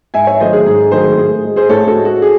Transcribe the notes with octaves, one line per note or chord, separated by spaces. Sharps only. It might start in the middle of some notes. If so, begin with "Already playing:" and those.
G#2 E5 G#5
C#5 E5
D#3 F#3 A3 C5 D#5
G#4
G#2 G#4
D#3 F#3 A3 G#4 C5
A2 G#4
G#3
G#4 C5
A2 A4 C#5
F#4 A4
G#3
F#4
G#4